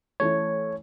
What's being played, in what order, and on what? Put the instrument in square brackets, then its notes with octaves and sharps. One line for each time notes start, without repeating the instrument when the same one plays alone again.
[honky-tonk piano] E3 A3 C#4 E4 [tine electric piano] C#5